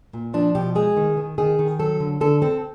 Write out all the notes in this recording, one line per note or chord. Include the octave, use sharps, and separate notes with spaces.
A#2
F3 D4
B2 G4
G#3 G#4
D#3
D#3
D#3 G#4
D#3
F#3 A4
D3
D3 A4
C4 A4